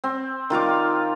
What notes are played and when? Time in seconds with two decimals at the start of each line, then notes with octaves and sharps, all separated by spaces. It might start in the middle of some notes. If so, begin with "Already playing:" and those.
0.04 C4
0.50 D#3 F4 F5 D6